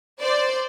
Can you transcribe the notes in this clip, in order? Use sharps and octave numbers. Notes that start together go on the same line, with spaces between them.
C5 D5